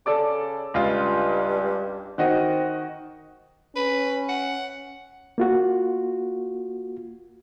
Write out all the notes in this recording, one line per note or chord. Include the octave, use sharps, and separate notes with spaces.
C#3 A4 D5 D6
C#2 G2 F4
D#3 C4 F#4 D#5
C#4 B4
F#5
A#3 F4 F#4